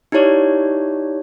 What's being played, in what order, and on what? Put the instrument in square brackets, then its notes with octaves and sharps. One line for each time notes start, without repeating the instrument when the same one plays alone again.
[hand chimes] D#4 E4 G4 C#5 D5